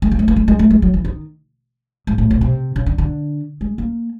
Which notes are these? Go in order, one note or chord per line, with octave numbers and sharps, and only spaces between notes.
G#3
A#3
A3
A#3
A3
G#3
A3
G#3
F#3
E3
D#3
G#2
A2
B2
C3
C#3
D3
D3
G#3
A#3